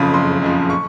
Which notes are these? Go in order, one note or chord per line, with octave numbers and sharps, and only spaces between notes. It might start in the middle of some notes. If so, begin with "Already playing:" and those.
Already playing: F#1 F2 C#3 F3 B5
F#1 C6
F2 C#3 F3
C#6